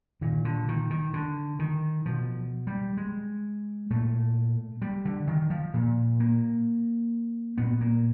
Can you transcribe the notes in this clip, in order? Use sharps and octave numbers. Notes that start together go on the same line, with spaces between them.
A#2 D#3
D3
D#3
D#3
D3
D#3
B2 F3
G3
G#3
A#2 A3
G3
D3
D#3
F3
A#2
A#3
A#2 B3
A#3